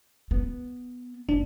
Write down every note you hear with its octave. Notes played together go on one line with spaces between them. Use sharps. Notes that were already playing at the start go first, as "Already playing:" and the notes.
B3
F#1 D4